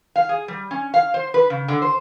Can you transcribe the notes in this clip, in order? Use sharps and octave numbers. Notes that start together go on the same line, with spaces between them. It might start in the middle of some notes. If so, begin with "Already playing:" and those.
F5
G#4
G3
C#4
F5
C5
B4
C#3
D3
C5